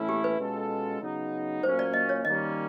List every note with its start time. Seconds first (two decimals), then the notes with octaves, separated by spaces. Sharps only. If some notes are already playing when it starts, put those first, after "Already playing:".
Already playing: A2 E3 A3 C#4 E4
0.09 G4
0.24 B4
0.39 B2 G#3 C#4 F4 A4
1.01 C#3 F#3 B3 D#4
1.63 A#2 F#3 A#3 C#4 C5
1.79 D5
1.94 D#5
2.09 C#5
2.25 D#3 G3 A#3 C#4 D#5